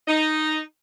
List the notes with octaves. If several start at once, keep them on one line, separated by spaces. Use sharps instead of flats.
D#4